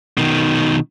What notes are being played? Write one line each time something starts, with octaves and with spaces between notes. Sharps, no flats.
B2 D#3